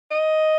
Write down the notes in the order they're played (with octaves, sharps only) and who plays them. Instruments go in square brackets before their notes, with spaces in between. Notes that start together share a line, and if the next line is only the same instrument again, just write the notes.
[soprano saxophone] D#5